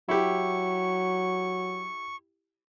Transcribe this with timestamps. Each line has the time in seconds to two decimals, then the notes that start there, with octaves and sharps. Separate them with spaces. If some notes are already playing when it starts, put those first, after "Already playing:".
0.09 F#3 E4 G4 C#6